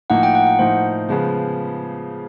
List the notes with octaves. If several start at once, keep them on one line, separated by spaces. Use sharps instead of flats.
A2 F3 A#3 D#4 F#5
G5
F#5
F#5
A2 F3 A#3 D#4 C5
C#3 F3 G#3 B3